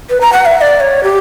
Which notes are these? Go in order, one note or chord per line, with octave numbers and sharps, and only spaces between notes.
B4
A#5
F#5
E5
E5
D5
C#5
G4